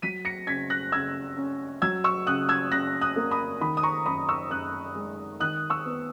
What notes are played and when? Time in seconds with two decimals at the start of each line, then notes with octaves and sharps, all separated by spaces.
0.02 F#3 B6 D#7
0.25 A#6 C#7
0.47 C#3 G#6 B6
0.70 F#6 A#6
0.92 C#3 E6 G#6
1.37 C#4
1.82 F#3 E6 G#6
2.04 C#6 E6
2.27 C#3 D#6 F#6
2.49 E6 G#6
2.71 C#3 F#6 A#6
3.01 D#6 F#6
3.16 A#3
3.31 B5 D#6
3.61 D#3 B5 D#6
3.77 D#6
3.83 A#5 C#6
4.06 F#2 B5 D#6
4.28 C#6 E6
4.51 F#2 D#6 F#6
4.95 G#3
5.40 D#3 D#6 F#6
5.70 C#6 E6
5.85 B3